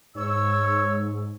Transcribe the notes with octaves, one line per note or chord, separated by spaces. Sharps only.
G#2 C#5 E6